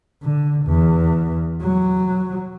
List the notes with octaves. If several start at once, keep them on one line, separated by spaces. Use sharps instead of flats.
D3
E2
F#3